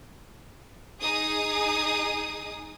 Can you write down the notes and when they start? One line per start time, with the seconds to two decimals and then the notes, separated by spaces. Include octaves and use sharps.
1.01 D#4 G#4 D#6